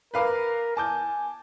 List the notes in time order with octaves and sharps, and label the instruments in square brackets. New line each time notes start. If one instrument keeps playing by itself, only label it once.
[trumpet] A#4 [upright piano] B4 F5 D6
[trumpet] G#5 [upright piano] A5 D6 G6